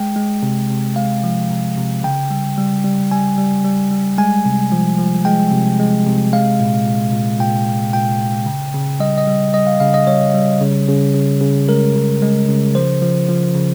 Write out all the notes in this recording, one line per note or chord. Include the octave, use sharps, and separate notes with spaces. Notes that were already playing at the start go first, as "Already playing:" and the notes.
Already playing: G#3 G5
G#3
C3
C3
G#3 F5
F3
C3
C3
C#3 G5
G3
G3
G3
G3 G#5
G3
G3
G3
G#3 G#5
C3
F3
F3
G#3 G5
C3
G#3
C3
G#3 F5
A#2
A#2
A#2
A#2 G5
A#2
A#2 G5
A#2
C#3
C#3
G3 D#5
D#5
G3
G3 D#5
F5
C#3 F5
D#5
G3 C#5
G3
C#3
C#3
C#3
C#3
G#3 A#4
C#3
G#3
C#3
F3 C5
F3
F3
C#3